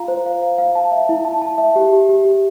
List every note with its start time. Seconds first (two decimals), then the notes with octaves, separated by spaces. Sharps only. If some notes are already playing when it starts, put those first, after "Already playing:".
Already playing: F4 F5 A#5
0.08 C5
0.26 F5
0.43 F5
0.58 F5
0.75 A5
0.92 E5
1.09 E4
1.25 A5
1.42 A5
1.58 E5
1.76 G4
1.92 G4
2.09 G4
2.25 G4